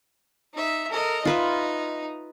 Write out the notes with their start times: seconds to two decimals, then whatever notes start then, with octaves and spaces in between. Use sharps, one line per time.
0.54 D#4 E5
0.91 A4 A#4 D#5
1.25 D#4 F4 B4 D#5 E5